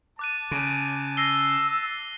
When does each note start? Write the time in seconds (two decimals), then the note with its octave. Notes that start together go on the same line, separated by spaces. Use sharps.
0.19 A5 D6 F#6 D#7
0.51 C#3
1.17 E6 A#6 C7 G7